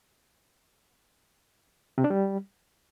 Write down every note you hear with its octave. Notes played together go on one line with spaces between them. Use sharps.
C3
D4
G3